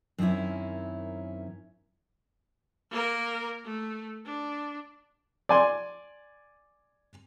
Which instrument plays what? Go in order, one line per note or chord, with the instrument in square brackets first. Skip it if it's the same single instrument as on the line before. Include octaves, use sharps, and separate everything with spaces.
[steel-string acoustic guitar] F#2 D#3 C4 C#4 E4
[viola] A#3 A#4
A3
D4
[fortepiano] D5 G#5 C6